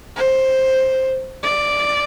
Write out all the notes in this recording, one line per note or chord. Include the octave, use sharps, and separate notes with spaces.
C5
D5